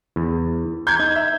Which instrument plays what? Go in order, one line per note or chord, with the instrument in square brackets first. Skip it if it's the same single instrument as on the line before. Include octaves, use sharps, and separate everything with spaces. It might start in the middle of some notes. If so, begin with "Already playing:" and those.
[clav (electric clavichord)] E2
[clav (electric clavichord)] A#5 [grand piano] G6 G#6
[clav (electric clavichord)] D#4
[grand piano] E5